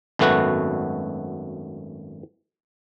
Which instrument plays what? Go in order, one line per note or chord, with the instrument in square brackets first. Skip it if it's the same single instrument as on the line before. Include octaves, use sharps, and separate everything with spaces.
[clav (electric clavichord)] G#1 F#2 A3 B3 F#4